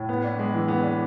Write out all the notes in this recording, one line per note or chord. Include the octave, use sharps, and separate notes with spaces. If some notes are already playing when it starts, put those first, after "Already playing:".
Already playing: A2
B3
D4
G#3
E3
B3
D4